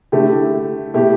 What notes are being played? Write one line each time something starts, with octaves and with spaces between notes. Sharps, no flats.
D3 A3 E4 G4
B2 A3 E4 G4